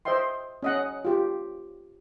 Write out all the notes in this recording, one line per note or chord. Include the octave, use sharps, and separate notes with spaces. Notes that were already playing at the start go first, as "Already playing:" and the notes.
C5 D#5 E5 G5 C6
C#4 D#5 F#5
F4 G4